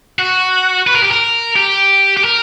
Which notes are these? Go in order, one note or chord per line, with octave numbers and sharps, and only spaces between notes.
F#4
B4
A#4
G4
A#4
G4
G4
A#4